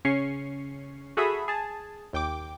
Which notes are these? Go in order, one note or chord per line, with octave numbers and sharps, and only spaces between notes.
C#3 C#4 C#6 C7
F#4 G#4 A4 E5 B5 D#6
G#4 A5
D#2 G5 D6